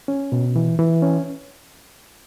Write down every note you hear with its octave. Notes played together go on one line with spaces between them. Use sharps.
C#4
B2
E3
E3
C#4